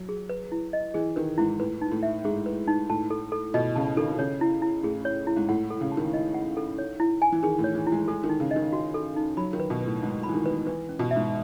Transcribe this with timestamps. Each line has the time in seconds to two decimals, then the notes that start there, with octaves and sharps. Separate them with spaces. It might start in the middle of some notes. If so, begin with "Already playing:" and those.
Already playing: F#3
0.09 G#4
0.29 B4
0.52 E4
0.73 D#5
0.94 E3 G#4
1.16 D#3 B4
1.38 G#2 E4
1.59 A2 B4
1.81 D#4
1.92 A2
2.03 E5
2.24 G#2 G#4
2.46 B4
2.68 D#4
2.89 A2 A5
3.10 A4
3.32 A4
3.54 B2 D#5
3.75 C#3 A5
3.97 D#3 A4
4.09 D#3
4.19 C#3 C#5
4.41 E4
4.62 E4
4.83 A2 G#4
5.05 C#5
5.27 E4
5.36 G#2
5.49 A2 F#5
5.70 A4
5.81 C#3
5.92 A5
5.97 D#3
6.13 D#5
6.34 F#5
6.57 A4
6.78 C#5
7.00 E4
7.22 G#5
7.32 E3
7.43 D#3 G#4
7.59 A2
7.64 C#5
7.75 E3
7.87 E4
7.92 G#3
8.08 G#3 A4
8.24 D#3
8.29 D#4
8.40 C#3
8.51 D#5
8.56 D#3
8.73 F#4
8.94 A4
9.16 D#4
9.37 F#3 B5
9.53 D#3
9.60 B4
9.70 B2
9.81 B4
9.86 A2
10.02 G#2 F#5
10.23 B5
10.29 E3
10.34 D#3
10.46 B4
10.67 E3 B4
10.89 C#4
10.99 B2
11.11 E5
11.16 G#2